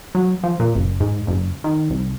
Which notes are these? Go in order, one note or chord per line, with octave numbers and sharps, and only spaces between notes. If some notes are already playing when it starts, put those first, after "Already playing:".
F#3
F3
A#2
F#1
G#2
F#1
D#3
C2